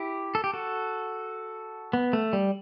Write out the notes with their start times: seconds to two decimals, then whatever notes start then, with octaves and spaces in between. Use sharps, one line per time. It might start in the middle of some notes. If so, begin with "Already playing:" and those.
Already playing: E4 G4
0.35 A4
0.44 G4
0.53 F#4 A4
1.93 B3
2.13 A3
2.33 G3